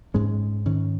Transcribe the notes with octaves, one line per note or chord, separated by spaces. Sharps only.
G#2 G#3 C#4
G#2 D#3 C#4